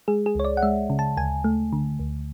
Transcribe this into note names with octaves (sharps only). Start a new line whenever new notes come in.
G#3 G#4
G#4
C#2 C#5
D5
F#5
G#3 E5
C#3
A5
D2 G#5
A3
D3
D2